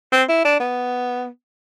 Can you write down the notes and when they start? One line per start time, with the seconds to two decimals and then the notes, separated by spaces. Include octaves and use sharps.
0.12 C4
0.29 E4
0.45 D4
0.60 B3